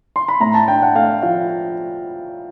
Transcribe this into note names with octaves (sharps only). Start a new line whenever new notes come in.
C6
B5
A2 A#5
A5
D4 G5
F#5
A3 F5
F3 F5